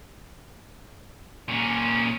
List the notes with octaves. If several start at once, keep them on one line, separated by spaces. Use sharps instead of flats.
A#2 C#4